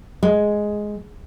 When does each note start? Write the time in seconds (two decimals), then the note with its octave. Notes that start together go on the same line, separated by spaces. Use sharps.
0.23 G#3